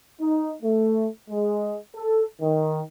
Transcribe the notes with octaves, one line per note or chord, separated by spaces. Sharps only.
D#4
A3
G#3
A4
D#3